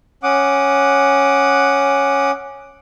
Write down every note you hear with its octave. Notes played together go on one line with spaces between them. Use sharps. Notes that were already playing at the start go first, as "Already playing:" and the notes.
C#4 F#5 D6 D#6